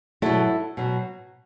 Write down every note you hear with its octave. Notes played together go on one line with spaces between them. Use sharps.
B2 F#3 E4 A4
B2 F#3